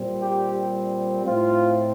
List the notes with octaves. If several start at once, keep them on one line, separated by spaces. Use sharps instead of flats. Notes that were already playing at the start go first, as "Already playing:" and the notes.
Already playing: A#2 G3 C4
G4
A2 A3 C4 F4